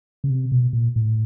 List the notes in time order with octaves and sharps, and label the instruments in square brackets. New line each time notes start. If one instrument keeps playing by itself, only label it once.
[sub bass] C#3
C3
B2
A#2
A2